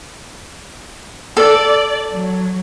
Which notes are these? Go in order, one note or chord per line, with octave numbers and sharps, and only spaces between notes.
A4 D5
F#3